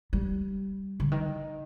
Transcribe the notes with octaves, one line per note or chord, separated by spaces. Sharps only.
G3
D3
D#3